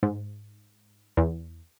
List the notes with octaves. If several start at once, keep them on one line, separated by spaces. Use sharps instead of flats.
G#2
E2